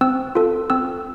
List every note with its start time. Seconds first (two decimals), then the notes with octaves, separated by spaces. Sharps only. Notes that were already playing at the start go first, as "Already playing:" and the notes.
0.01 C4 E6
0.35 F4 A4
0.70 C4 E6